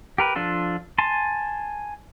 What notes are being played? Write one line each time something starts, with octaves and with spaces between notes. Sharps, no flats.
G4 A#4 B4
F3 D4 F4 A4
G#5 A5 C6